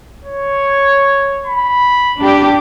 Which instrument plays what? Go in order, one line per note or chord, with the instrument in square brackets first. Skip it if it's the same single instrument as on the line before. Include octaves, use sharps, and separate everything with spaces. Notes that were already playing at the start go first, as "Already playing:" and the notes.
[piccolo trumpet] C#5
B5
[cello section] D4 G4